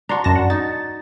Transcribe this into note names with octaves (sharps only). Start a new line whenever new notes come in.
D4 F#4 A#5 C6 C#6
F#2 A5 A#6
F#5
D#4 A6